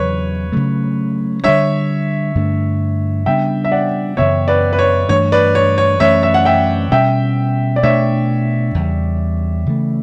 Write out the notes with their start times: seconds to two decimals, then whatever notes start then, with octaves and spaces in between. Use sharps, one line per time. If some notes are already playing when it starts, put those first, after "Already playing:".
Already playing: E2 C#3 F#3 B4 C#5
0.52 C#3 F#3 A3
1.44 D3 G3 D4 C#5 E5
2.35 G2 D3 A3 D4
3.26 C#3 G3 B3 D4 E5 G5
3.65 E5
3.72 D5 F#5
4.17 F#2 C#3 E3 B3 C#5 E5
4.48 B4 D5
4.73 B4
4.79 C#5
5.09 G2 E3 A3 D4 C#5
5.32 B4 D5
5.55 C#5
5.78 C#5
6.00 F#2 E3 A3 C#4 C#5 E5
6.23 E5
6.34 F#5
6.45 E5 G5
6.91 B2 G3 C#4 E5 G5
7.76 D5
7.83 B2 A3 D4 C#5 E5
8.75 E2 C#3 G3
9.66 C#3 E3 A3